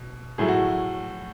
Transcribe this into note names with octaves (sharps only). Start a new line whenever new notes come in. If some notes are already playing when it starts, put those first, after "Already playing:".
Already playing: B2
A2 F#3 A3 G#4
F#4